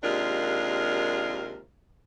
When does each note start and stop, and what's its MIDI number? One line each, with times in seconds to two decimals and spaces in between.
0.03 1.62 39
0.03 1.62 48
0.03 1.62 56
0.03 1.62 62
0.03 1.62 65
0.03 1.62 70